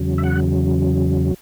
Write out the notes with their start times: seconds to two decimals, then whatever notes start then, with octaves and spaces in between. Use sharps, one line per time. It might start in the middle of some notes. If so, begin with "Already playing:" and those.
Already playing: E2 C#3 F#3
0.18 E5
0.24 F#5